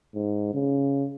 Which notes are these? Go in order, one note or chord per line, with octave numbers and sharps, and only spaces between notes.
G#2
C#3